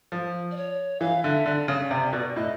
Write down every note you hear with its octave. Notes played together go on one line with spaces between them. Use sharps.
F3
D5
C#5
E3 F5
D3 E5
D3 D5
C#3
C3
B2
A2 D#5